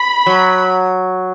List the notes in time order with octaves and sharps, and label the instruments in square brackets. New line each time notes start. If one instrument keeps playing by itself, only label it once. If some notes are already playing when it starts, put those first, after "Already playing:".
Already playing: [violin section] B5
[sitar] F#3